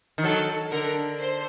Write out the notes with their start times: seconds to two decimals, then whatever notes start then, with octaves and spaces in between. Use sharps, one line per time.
0.18 D#3
0.24 F#3 A4
0.71 D3 A#4
1.18 C5